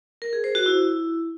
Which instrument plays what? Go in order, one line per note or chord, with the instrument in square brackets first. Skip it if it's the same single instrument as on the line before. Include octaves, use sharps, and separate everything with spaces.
[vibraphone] A#4
G#4
C5
F#4
E4